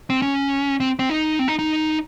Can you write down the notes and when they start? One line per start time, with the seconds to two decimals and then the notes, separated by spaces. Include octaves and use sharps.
0.10 C4
0.22 C#4
0.80 C4
0.99 C4
1.09 D#4
1.39 C4
1.48 D#4
1.59 D#4